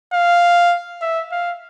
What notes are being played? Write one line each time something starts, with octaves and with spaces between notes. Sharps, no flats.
F5
E5
F5